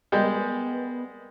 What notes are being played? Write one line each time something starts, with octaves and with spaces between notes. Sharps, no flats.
G3 G#3 B3 A#4 D#5